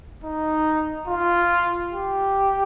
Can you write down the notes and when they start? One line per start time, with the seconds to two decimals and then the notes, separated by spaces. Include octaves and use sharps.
0.24 D#4
1.07 F4
1.92 G4